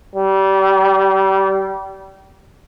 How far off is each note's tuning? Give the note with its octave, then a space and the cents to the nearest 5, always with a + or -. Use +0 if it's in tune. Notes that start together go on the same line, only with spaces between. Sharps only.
G3 -25